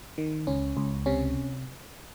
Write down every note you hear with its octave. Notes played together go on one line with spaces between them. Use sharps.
D#3
C#2 C#4
C#2
C3 C#4